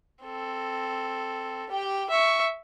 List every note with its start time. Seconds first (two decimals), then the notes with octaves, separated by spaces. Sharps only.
0.24 C4 A4
1.70 G4 G5
2.10 E5 C#6